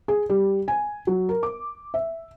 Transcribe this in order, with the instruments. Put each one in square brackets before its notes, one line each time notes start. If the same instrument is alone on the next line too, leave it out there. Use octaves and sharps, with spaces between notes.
[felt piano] G#4
G3
G#5
F#3
A#4
D6
E5